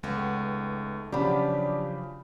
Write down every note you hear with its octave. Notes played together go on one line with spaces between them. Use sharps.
C#2 D#3 A3 B3
C#3 F3 F#3 D4 G4 B5